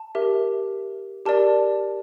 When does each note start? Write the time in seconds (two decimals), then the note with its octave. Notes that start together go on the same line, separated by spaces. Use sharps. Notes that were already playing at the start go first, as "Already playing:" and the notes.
Already playing: A5
0.15 G4 A#4 E5
1.26 G4 A#4 D5 A5